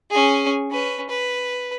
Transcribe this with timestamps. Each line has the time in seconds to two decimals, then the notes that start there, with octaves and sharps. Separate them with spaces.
0.11 C#4 G#4
0.71 C#4 B4
1.09 B4